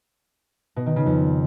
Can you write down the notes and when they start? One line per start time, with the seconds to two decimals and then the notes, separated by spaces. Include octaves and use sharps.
0.76 B2
0.86 D#3
0.96 C#3
1.06 F2